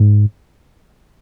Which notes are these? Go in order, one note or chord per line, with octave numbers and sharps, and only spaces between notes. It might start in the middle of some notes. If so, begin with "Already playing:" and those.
Already playing: G#2